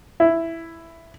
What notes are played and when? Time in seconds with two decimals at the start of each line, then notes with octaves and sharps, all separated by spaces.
0.20 E4